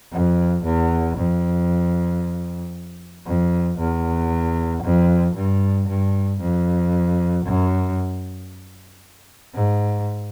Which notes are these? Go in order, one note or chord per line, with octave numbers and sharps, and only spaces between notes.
F2
E2
F2
F2
E2
F2
G2
G2
F2
F#2
G#2